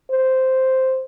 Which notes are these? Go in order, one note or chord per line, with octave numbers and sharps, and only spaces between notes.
C5